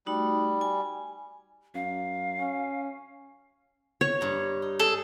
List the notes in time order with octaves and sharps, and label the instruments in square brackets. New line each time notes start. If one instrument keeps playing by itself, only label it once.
[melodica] G3 [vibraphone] A3 D#4 F#4
[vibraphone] G#5
[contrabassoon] F#2 [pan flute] F5
[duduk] C#4
[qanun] C#5
[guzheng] G2 A#5
D#4
[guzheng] G#4 D#5 [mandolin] A4